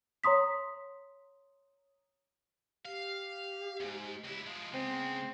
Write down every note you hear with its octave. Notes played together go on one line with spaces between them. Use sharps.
C#5 A#5 C6 D#6 B6
G4 F5
E2 G#2
C#2 E4
F3 G#3
C#3 G#3 B3 C4